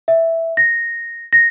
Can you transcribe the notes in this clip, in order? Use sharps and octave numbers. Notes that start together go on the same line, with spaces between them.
E5
A#6
A#6